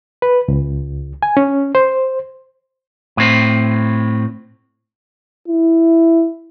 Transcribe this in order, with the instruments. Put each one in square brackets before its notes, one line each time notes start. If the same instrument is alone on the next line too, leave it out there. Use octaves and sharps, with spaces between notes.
[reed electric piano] B4
C#2
G#5
C#4
C5
[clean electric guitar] A2 C4
[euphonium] E4